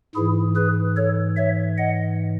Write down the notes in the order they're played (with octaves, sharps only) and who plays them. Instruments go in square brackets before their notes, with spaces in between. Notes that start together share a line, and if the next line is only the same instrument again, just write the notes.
[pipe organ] G#2 E3 E4 G#4
G#4 B4
A4 C#5
C#5 E5
D#5 F#5